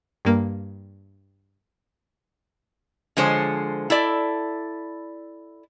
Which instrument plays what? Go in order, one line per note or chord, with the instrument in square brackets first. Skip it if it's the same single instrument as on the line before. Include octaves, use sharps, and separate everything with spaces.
[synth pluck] G2 A#3
[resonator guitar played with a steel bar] D3 F3 G#3 C5 C#5
E4 A4 D5